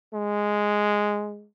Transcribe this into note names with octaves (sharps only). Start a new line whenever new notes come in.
G#3